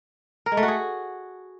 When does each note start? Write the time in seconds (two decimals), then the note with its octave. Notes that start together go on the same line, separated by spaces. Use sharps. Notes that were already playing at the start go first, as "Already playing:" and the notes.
0.46 A#4
0.52 G#3
0.57 A3
0.63 F#4
0.68 G#4